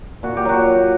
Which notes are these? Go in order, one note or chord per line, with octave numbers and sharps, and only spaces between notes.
A#2 F#4
G4
F#3 F#4